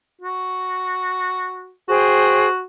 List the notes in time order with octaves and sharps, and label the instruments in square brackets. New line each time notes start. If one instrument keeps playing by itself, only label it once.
[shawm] F#4
[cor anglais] F#4 [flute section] G#4 C5 G5